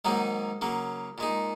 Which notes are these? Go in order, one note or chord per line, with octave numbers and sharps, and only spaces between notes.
G#2 D#3 F#3 A#3 D#4
C#3 F#3 A#3
A#2 G#3 D#4